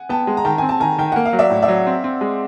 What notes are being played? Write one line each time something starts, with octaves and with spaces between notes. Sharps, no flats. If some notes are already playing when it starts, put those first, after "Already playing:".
Already playing: F#5 G#5
B3 G5 A5
G#3
A#5
D#3 G5 A5
C4 G#5
A5
D#3 G#5 A#5
D#3 G5
A#3 F#5
F5
F#3
D5 E5
A2
D5 E5
F#3
C4
C4
G#3